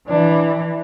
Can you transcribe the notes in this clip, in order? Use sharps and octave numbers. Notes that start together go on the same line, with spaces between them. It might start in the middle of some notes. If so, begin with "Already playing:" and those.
E3 D4